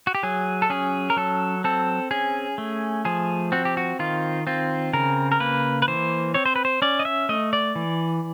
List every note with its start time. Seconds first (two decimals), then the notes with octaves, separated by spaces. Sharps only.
0.07 F#4
0.15 G4
0.23 F#3 G#4
0.62 A4
0.70 C#4 G#4
1.10 A#4
1.17 F#3 A4
1.64 C4 A4
2.11 C#4 G#4
2.58 A3
3.05 F3 G#4
3.52 C4 F#4
3.65 G4
3.77 F#4
3.99 D#3 F4
4.47 C4 F4
4.93 C#3 A#4
5.32 A#4
5.40 A#3 B4
5.82 B4
5.88 E3 C5
6.34 C4 C#5
6.46 C5
6.56 B4
6.65 C5
6.82 C#4 D5
6.99 D#5
7.05 E5
7.29 A3 D#5
7.53 D5
7.76 E3